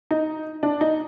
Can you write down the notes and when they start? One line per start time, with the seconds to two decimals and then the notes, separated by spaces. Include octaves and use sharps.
0.11 D#4
0.63 D4
0.81 D#4